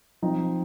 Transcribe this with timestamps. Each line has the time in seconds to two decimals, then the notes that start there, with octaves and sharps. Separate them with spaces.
0.22 F3 C4 D#4